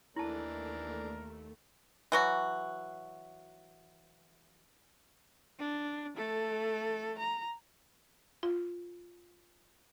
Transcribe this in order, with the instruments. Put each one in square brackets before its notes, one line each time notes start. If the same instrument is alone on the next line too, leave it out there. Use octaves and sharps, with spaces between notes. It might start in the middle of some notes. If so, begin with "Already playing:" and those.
[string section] D#2 A3 [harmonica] E3 D4 [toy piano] E4 A5 [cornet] A#4
[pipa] E3 F#3 F#4
[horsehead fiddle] D4
A3 A4
A#5
[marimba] F4